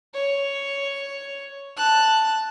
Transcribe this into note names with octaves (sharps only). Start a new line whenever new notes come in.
C#5
A5 F#6